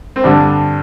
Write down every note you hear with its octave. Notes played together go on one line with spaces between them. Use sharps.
C4
G2 D3 G3 D4